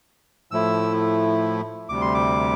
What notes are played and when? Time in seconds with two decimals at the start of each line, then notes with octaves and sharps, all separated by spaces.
0.51 A2 F3 A3 E4 E6
1.89 D2 C3 G3 D6
2.01 C6
2.14 D6